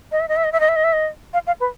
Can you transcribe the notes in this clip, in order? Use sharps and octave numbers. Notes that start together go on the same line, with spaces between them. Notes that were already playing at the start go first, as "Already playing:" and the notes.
D#5
E5
D#5
E5
D#5
E5
D#5
E5
D#5
E5
D#5
F5
F5
B4